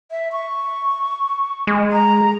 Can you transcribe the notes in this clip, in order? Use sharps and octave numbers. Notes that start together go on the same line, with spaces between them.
E5
C#6
G#3
A#5